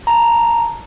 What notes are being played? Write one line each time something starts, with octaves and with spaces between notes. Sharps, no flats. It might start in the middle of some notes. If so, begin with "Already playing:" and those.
A5 A#5